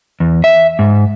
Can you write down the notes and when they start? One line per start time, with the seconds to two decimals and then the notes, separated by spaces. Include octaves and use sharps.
0.20 E2
0.44 E5
0.79 G#2